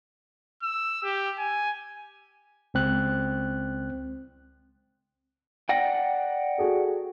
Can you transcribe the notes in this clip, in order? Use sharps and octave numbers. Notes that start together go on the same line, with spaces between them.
E6
G4
G#5
C#2 C4 F#6
D5 F#5 G5 A#6
F#4 G#4 A4